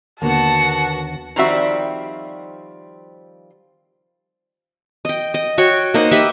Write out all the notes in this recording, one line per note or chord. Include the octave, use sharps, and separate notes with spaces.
D#2 D3 A#3 B3 F#4 F#5 A5
D#3 F3 G3 C4 F#4 E5
D#5 G5
D#5
F#4 C#5 G5
A#3 D#4 C5 F#5
G4 B4 D#5 E5